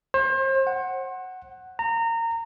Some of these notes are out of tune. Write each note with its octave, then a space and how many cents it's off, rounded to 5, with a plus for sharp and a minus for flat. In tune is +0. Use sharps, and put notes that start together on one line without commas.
C5 +35
F#5 +5
A#5 -25